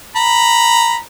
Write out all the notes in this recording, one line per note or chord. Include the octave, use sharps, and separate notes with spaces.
A#5 B5